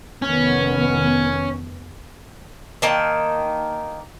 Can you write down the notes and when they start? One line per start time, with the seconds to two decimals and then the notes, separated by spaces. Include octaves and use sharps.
0.22 F1 D#3 B3 C#4
2.82 D#3 A#3 A5